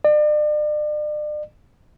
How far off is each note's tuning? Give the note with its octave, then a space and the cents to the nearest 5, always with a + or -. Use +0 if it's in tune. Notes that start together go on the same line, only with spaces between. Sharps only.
D5 +40